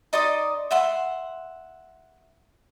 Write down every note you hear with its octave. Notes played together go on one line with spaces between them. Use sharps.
D#4 D5 C6 D#6
E5 F#5 C6